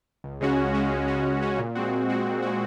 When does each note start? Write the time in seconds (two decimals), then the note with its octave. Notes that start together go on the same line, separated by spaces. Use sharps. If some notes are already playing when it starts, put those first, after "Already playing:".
0.24 C#2
0.41 C#3 G#3 C#4 F#4
0.58 C#2
0.74 C#3 G#3 C#4 F#4
0.91 C#2
1.08 C#3 G#3 C#4 F#4
1.25 C#2
1.41 C#3 G#3 C#4 F#4
1.59 A#2
1.75 G#3 C4 F#4
1.92 A#2
2.09 G#3 C4 F#4
2.26 A#2
2.42 G#3 C4 F#4